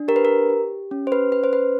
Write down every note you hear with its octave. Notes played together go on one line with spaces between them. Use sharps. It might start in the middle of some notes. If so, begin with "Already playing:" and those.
Already playing: D4
G4 A#4
B4
A#4
G4
C#4
C5
B4
C#4 B4
C5
B4